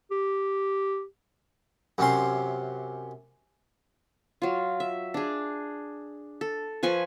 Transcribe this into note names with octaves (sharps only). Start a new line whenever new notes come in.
G4
F#2 C3 C#4 C6
F#3 F4
E5
D4 G#4
A4
F3 B4 G#5 C#6